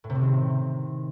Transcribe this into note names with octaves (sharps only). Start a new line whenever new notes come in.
A2
C3
C4
D#3